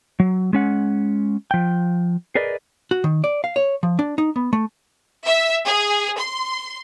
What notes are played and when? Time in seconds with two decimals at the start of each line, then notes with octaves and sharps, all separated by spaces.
0.20 F#3
0.53 G#3 C#4 F#5
1.51 F3 G5
2.35 G#4 A#4 B4 D5 D#5
2.91 F#4
3.04 D#3
3.24 D5
3.44 F5
3.56 C#5
3.83 F3
3.99 D4
4.18 D#4
4.36 B3
4.53 A3
5.25 E5
5.66 G#4
6.18 C6